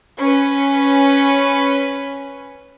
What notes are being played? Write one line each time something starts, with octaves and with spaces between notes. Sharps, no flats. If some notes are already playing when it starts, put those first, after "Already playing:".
C#4 B4